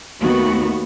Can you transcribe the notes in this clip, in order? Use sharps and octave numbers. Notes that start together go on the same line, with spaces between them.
D#2 D#3 A3 B3 F#4